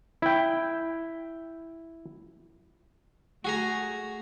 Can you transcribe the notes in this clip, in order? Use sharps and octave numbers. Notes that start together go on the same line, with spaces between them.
E4 G5
A3 F#4 G#4 A#5